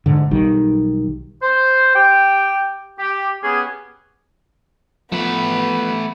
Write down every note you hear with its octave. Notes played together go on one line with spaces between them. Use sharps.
G#2 D3
B1 D#3 G3
C5
G4 G5
G4
B3 C#4 G4 G#4
F3 A3 B3 B4